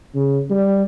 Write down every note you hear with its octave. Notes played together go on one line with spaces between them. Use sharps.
C#3
G3